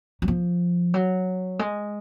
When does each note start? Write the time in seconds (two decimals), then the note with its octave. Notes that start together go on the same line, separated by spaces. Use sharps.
0.22 F#3
0.28 F3
0.94 F#3
1.59 G#3